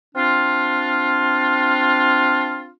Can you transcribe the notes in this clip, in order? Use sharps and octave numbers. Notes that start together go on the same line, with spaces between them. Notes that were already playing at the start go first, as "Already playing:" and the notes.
C4 D4 F4